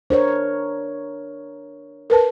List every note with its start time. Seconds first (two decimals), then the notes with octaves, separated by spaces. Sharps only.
0.10 D4 A#4 C5 C#5
2.10 A#4 B4 A5